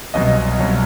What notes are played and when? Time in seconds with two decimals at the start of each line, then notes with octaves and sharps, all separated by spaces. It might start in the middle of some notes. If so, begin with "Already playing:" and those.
0.14 C2 B2 F#3 D#5
0.59 C2 B2 F#3